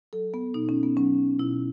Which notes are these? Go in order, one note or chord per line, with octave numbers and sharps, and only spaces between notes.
F#3 A4
B3
B2 D#4
C#4
B3
F#3 C#4
B2 E4